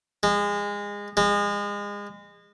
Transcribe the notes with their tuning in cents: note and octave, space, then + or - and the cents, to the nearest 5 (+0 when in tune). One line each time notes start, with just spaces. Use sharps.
G#3 -25
G#3 -30